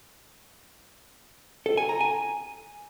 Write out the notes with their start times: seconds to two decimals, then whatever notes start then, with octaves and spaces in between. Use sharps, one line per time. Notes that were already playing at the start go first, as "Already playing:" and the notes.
1.66 A4
1.77 G#5
1.89 A#5
2.01 G#5